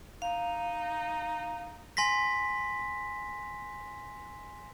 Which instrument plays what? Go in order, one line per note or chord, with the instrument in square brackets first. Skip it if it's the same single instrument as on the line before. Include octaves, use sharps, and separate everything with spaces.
[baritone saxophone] D#4 [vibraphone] F5
[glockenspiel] G#5 C6 A#6 B6